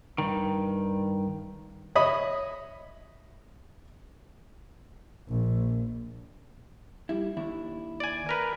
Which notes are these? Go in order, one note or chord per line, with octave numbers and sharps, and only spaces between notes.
G2 D#3
C#5 D#5 E5 B5 D#6
A#1
G3 E4
D#2 D4 E4
D5 G#5
A#4 B4